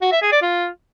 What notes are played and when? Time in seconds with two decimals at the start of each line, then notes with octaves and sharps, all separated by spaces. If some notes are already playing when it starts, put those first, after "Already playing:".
0.02 F#4
0.12 E5
0.22 G#4
0.32 D5
0.42 F4